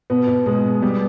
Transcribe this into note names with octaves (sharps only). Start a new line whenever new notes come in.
B2 B3
B2
B2 G#3
B2
B2 G3